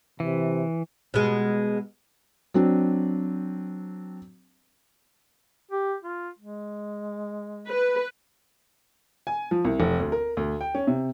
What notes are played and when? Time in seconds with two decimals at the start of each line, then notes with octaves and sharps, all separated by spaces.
0.20 C3 E3
1.14 B2 G#3
2.54 F#3 C4 D4
5.71 G4
6.04 F4
6.39 G#3
7.68 B4
9.27 G#5
9.51 F3
9.65 C2
9.80 F1
10.00 D2
10.12 A#4
10.37 D2
10.61 G5
10.75 C#4
10.87 C3